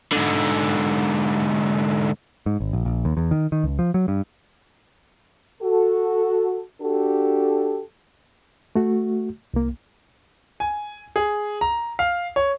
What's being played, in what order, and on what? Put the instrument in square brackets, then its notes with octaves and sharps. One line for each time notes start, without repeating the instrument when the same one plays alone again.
[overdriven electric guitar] G#2 D3
[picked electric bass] G#2
G#1
A#1
A#1
D#2
E2
D#3
D#3
C#2
F3
F#3
G2
[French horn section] F#4 A4
D4 F#4 G4 A4
[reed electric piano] A3 F#4
C2 A#3
[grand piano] G#5
G#4
A#5
F5
C#5